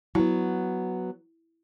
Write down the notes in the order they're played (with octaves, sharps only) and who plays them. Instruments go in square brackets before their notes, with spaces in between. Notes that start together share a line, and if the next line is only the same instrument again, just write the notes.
[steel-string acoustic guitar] F#3 B3 [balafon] E4